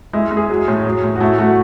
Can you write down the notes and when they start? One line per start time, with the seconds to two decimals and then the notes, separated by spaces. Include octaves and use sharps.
0.13 G#3 E4
0.31 G#3
0.37 G#4
0.50 F#3
0.68 A2
0.86 F#3
1.03 A2
1.16 F#4
1.20 A3 E4
1.38 A3 F#4